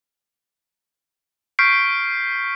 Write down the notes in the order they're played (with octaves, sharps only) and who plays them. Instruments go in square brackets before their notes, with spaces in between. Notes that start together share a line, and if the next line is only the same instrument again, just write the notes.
[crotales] C#6 F6 G6 B6 C7 D7